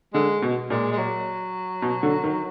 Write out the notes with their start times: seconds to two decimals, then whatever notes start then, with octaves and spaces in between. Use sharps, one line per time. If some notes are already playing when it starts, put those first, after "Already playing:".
0.14 D3 G#3
0.42 B2
0.70 A#2 G#3
0.92 G#3
0.98 F#3
1.82 B2
2.03 D3
2.24 D#3